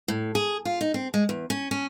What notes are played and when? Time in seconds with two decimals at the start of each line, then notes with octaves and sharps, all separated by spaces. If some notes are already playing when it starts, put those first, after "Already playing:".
0.08 A2
0.35 G#4
0.65 F4
0.81 D#4
0.94 C4
1.14 G#3
1.29 E2
1.50 C#4
1.71 C#4